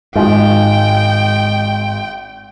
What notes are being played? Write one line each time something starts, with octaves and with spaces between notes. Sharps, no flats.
G#1 G#2 G#3 F4 G5